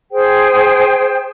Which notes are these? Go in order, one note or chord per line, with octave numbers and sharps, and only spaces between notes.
G#4 C5 G5